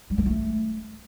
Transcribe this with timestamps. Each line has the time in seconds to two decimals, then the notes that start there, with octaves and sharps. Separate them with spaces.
0.10 G3
0.18 A#3
0.26 A3